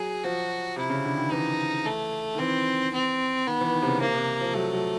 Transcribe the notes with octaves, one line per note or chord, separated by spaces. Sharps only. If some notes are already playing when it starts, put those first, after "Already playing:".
Already playing: F#3 G#4
F3 F#4
C3 E4
C#3
D3
D#3
E3 D#4
A3
D#3
E3 C4
C4
D#3 B3
E3
D#3
C3
C#3
C3 A#3
C3
F3
F#3 A3
F#3